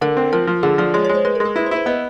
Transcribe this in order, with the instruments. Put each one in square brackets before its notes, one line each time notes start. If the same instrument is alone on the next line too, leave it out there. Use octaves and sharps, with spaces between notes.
[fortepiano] D3 [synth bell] A#4
[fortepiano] C4
[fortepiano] F3 [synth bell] A#4
[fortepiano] F3
[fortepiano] D3 [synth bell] G#4
[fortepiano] F3 [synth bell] D5
[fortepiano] G#3 [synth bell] C#5
[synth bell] C#5
[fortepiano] G#3
[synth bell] C5
[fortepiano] G#3 [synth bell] B4
[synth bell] A#4
[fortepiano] G#3
[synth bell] G#4
[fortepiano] E4 [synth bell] B4
[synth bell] C5
[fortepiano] E4 [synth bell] B4
[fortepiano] B3 [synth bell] D#5